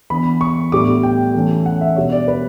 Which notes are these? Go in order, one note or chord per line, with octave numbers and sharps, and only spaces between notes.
E3 B3 D4 B5
C#6
A2 G3 B3 D4 D6
G5
E3 A3 C#4
F#5
E5
B2 G3 D4 C#5
D5
B4